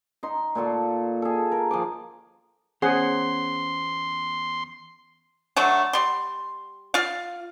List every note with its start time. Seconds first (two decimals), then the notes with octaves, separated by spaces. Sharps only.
0.23 D#4 C6
0.55 A#2 F4 A4 C#6
1.22 G#4 A4
1.52 A#4
1.71 F3 G#5 D6
2.82 E2 C#4 G#4 C5 F#5 C6
5.56 D3 F#3 A3
5.93 G3 C6
6.94 F4 F5